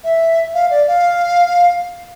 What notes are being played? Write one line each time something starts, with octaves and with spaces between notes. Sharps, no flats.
E5
F5
D5
F5